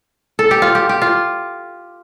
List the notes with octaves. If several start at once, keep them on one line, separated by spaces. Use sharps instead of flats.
A4
G4
F4
G4
G4
F4